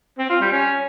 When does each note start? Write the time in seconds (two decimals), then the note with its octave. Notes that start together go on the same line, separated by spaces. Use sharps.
0.19 C4
0.30 F4
0.41 G3
0.52 C#4